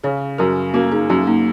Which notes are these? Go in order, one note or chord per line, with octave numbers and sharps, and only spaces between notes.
C#3 G#4 C#5
F#2 F#4 A#4
A#3 C#4 F#4
D#4 G#4
F#2 C#4 F#4
A#3 D#4